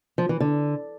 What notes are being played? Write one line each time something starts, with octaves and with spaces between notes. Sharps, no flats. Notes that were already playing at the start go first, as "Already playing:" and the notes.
F3
E3
D3